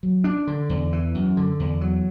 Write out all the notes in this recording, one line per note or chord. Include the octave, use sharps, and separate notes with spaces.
F#3
D4
D3
E2
E3
F#2
D3
E2
F#3